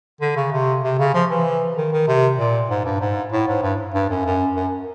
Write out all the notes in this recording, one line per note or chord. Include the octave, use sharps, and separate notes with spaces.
D3
C#3
C3
C3
C#3
F3
E3
D#3
D#3
C3
A#2
G#2
G2
G#2
A2
G#2
G2
G2
F#2
F#2
F#2